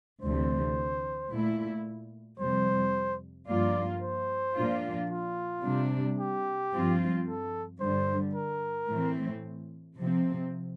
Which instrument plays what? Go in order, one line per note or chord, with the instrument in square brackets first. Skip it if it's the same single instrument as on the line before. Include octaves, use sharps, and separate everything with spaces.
[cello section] D2 C3 E3 A3 [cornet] C5
[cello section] A#2 A3 E4
[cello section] F2 C3 G3 [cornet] C5
[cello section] G2 F3 A#3 F4 [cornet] D5
[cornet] C5
[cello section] A#2 F3 A#3 D4 F4
[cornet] F4
[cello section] C3 G3 D4
[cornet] G4
[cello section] G2 F3 C4 F4
[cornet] A4
[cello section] G2 D3 G3 [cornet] C5
[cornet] A#4
[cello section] A2 E3 A3 C4
C3 F3 C4